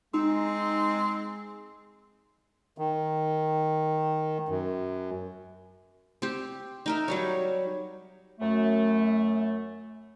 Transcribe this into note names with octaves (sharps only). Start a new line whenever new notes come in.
G#3 C4 D#4
D#3
F#2
C4 G4
D#4 A#4 E5
F#3 G3 C#5
F#2 A3